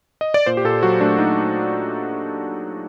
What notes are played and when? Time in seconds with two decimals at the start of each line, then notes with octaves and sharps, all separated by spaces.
0.21 D#5
0.34 D5
0.46 A#2 C5
0.57 G4
0.64 A#2 A4
0.83 F#3 F#4
1.01 A3 D4
1.18 A#2 D#4